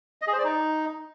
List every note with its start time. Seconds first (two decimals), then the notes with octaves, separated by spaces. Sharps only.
0.22 D#5
0.27 G#4
0.33 C5
0.38 D5
0.44 D#4